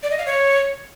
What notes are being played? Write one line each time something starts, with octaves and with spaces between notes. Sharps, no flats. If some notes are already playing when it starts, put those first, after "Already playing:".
D5
D#5
F5
C#5